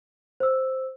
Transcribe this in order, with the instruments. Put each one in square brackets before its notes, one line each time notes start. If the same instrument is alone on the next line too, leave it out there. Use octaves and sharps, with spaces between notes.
[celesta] C5 E6